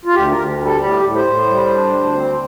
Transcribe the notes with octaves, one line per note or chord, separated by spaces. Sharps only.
F4
D2 G4
A#4
D2
G3
A4
A2 G4
A2
C5
A2
G3
D4
D2
C4